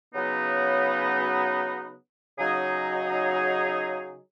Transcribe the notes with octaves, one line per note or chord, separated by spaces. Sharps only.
C#3 F#3 B3 D#4
C#3 F#3 D#4 G#4